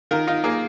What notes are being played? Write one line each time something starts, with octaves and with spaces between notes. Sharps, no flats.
D#3 F4 A#4
D#4 F4
A#3 G#4